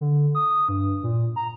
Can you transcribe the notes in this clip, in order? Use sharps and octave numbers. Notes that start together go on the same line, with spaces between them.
D3
D#6
G2
A#2
A#5